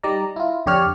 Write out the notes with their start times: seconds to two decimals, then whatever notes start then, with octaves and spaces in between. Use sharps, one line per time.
0.03 G3 D#4 D5 A#5
0.36 E4 F4
0.66 F2 D3 G4 C#5 D5 F6